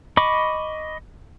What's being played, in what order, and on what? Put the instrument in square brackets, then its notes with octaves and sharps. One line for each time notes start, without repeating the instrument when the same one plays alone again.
[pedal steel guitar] D#5 B5 C#6 D6